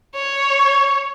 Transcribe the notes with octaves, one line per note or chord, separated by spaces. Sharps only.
C#5